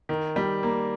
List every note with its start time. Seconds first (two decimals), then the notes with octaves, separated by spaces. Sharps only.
0.09 D#3
0.36 G3
0.63 A#3